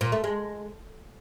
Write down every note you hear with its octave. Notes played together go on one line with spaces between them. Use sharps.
A#2
A3
G#3